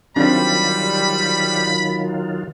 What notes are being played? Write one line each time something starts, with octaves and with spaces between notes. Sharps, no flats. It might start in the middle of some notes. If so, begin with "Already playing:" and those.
D#3 F#3 G3 C4 D4 F4 B5